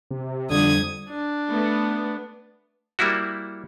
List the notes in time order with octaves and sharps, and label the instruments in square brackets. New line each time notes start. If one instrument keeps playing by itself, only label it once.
[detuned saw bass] C3
[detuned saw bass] F2 [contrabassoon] D3 [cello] G3 [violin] D#6 G#6
[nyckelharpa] D4
[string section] A3 B3
[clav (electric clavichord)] G3 A#3 E4 F#4